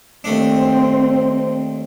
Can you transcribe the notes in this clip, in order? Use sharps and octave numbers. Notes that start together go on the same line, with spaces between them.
D#2 A3 C4 D4